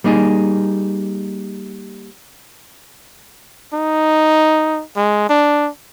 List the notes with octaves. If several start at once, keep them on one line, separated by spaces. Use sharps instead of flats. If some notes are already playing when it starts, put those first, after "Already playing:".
G3 A#3 D#4 G#4
D#4
G#3
D4